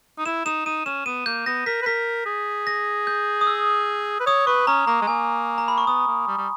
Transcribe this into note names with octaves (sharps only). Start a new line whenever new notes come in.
D#4
E4 E7
D#4 E7
D#4 D#7
C#4 E7
B3 D#7
A#3 G6
B3 A#6
A#4 B6
B4
A#4 B6
G#4
A#6
G6
D#6
E6
B4
C#5 D#6
B4 C#6
C#4 A#5
A#3 A#5
G#3
A#3 G#5
A#5
B5
C#6
B3 D#6
A#3
G3
G3